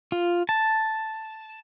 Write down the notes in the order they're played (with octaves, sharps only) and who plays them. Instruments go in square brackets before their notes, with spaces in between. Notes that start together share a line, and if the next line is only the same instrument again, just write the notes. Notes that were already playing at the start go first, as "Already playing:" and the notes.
[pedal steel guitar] F4
A5